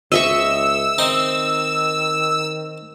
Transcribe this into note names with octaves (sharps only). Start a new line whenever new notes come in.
C#2 D#5 E5 C#6 E6
D#3 C4 D#4